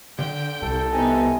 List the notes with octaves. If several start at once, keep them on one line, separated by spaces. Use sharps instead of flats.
D3 G5
C2 A4
C3 B3 C4 D#4 G#5